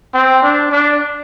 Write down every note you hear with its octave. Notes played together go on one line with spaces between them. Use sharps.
C4
D4
D4